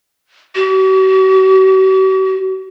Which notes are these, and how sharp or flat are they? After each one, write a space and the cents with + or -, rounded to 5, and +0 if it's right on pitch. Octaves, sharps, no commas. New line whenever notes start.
F#4 +45